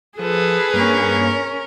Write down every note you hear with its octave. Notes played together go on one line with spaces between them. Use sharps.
F3 G#4 A4 B4
G2 A#3 C#4 A#4 C#5